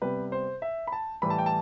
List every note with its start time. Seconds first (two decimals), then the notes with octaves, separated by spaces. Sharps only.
0.01 C3 G3 B3 B4
0.32 C5
0.62 E5
0.87 B5
0.92 A5
1.22 A2 E3 G3 B5
1.30 A5
1.38 G5
1.46 A5